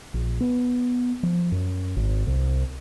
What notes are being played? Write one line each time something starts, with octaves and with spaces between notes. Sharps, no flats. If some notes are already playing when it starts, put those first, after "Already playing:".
A#1
B3
F3
F#2
G#1
C2